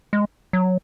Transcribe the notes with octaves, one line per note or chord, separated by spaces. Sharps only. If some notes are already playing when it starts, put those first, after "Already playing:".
G#3
F#3